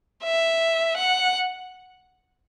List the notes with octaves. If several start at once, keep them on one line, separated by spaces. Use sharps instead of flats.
E5
F#5